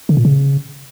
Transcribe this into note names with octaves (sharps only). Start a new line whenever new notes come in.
D3
A#2
C#3